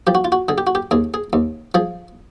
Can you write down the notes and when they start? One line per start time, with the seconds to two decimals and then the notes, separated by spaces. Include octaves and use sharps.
0.07 F3 G4
0.15 F#4
0.25 F4
0.32 F#4
0.49 D3 G#4
0.58 G4
0.67 F#4
0.75 G4
0.91 D#2 G#4
1.14 G#4
1.33 D#2
1.74 F3 G#4